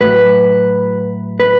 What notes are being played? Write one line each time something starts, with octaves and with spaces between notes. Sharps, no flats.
A2 F#3 B4
B4